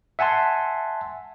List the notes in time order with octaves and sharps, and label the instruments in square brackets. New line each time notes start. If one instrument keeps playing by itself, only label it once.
[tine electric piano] E5 F#5 G#5 A5 C6